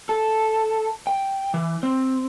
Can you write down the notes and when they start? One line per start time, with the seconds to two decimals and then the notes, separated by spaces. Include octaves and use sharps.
0.09 A4
1.07 G5
1.54 E3
1.83 C4